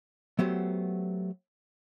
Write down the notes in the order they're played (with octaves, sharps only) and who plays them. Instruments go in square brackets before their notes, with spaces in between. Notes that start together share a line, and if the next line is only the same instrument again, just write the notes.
[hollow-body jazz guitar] F#3 A3 B3 G4 C5